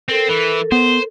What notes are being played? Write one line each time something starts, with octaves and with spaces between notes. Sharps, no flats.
C4 A4 A#4
E3
B3 C5